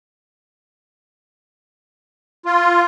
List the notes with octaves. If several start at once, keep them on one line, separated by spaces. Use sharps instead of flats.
F4